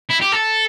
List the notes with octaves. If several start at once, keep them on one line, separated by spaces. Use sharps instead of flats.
E4
G4
A4